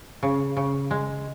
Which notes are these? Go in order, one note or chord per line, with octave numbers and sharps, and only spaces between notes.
C#3
C#3
G#3